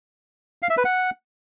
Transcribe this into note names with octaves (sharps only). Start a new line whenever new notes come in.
F5
E5
B4
F#5